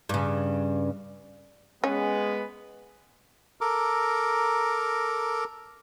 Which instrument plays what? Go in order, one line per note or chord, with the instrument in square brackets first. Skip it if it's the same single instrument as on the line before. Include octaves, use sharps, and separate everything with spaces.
[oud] G2 C#3
[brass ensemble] G#3 B3 B4 [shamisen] C#4
[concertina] A4 A#4 A#5 D6